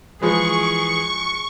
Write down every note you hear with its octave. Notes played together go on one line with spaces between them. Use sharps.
E3 F3 G#3 G#4 B4 C#6